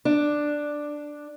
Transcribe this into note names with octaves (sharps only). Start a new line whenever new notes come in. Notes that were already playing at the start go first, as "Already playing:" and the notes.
D4